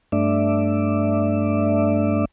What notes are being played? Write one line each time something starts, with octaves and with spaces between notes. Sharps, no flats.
G2 A3 D4 D5 E5